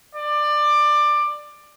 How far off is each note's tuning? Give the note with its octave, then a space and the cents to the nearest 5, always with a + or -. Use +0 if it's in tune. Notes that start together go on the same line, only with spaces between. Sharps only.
D5 +20